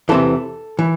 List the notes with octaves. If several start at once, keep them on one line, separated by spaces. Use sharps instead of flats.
E2 C3 E3 A4
E3